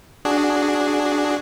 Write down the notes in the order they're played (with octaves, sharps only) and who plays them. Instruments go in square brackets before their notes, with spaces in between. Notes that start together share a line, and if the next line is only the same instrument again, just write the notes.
[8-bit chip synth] D4 F#4 G#4